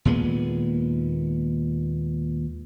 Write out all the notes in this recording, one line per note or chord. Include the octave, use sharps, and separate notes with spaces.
D#2 A#2 G#3 B3